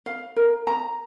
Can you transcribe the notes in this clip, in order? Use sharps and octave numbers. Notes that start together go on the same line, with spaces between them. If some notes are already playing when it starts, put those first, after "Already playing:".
F5
A#4
A#5